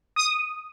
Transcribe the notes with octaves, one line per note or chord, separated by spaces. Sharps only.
D#6